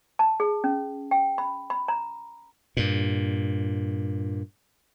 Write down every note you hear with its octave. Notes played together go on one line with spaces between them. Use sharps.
A5
G#4
C#4
G5
B5
B5
A#5
G2 A#2